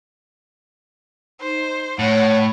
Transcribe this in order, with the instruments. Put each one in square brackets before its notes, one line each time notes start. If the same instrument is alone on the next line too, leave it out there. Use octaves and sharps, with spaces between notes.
[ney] D#4 [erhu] C5
[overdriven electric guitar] A2 [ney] C#5 [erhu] F#5